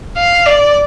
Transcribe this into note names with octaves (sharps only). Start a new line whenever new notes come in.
F5
D5